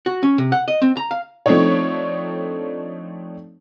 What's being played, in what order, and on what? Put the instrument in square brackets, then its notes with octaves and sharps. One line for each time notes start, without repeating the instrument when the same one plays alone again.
[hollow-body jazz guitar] F#4
C#4
C3
F#5
D#5
C4
A#5
F5
[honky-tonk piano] F3 A3 C4 D4 D#4 C#5